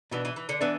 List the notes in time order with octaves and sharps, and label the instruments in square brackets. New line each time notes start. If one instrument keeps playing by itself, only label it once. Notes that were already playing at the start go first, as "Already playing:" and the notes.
[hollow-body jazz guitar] B2 B3 D4 [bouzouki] E3
[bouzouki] E3
E3
D3
[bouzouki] E3 [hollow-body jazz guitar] B3 D4